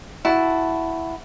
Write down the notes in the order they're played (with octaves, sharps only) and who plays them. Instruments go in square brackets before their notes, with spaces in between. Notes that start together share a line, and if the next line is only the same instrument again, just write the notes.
[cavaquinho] E4 F#4 A5